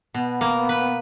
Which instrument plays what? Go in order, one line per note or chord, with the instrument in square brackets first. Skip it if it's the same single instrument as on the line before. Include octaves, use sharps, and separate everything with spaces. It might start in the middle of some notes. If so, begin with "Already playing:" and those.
[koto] B2 [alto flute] B3
[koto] A#3
B4